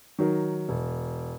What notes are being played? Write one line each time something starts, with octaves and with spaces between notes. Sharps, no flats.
D#3 F#3 A#4
E1